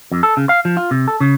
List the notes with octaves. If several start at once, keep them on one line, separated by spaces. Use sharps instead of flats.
F2
A4
C#3
F5
F3
F4
C3
A4
C#3